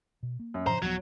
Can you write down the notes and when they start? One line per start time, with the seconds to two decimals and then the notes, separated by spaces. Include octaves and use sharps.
0.23 B2
0.40 A#3
0.54 F#2
0.67 A2 C#3 F3 C5 A#5
0.82 D#1 F3 F#3 B3